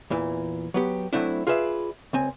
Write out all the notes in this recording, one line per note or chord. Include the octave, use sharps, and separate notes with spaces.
E2 A#2 E3
F#3 B3 G4
F#3 A3 C4 D4 E4
F4 G#4 B4 D5 E5
C#2 C4 G#5